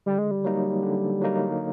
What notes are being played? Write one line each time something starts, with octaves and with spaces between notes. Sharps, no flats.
D3 G3
G#3
G3
F#3 A#3 D#4
D3
F#3 A#3 D#4